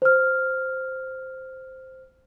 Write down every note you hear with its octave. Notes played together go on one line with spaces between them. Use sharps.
C5 F6